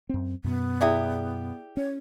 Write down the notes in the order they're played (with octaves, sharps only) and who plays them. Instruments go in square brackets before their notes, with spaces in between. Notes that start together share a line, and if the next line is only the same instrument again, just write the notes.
[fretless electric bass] F#2 C4
[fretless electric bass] F#2 B2 [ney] B3
[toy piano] E4 G#4 D5 [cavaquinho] G4 E5 D#6
[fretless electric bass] C#4 [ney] C#5